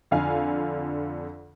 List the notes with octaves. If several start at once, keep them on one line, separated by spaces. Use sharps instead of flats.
F2 D3 F5 G#5 F6